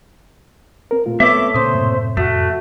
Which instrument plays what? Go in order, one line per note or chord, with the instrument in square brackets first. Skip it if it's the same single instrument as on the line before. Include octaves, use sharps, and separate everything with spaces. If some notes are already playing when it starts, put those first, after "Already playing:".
[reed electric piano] C4 A#4
A#2 A3 F4
[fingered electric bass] A3 [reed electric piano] B3 C4 B4 [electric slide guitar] A4 C#5 E5 [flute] D6
[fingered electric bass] A#2 C4 [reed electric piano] C#3 D#6 [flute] C5
[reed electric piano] F#2 A2 C3
[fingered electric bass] F2 [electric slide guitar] A3 [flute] F#4